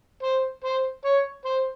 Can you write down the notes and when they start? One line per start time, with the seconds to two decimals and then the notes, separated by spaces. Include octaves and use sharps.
0.23 C5
0.64 C5
1.05 C#5
1.45 C5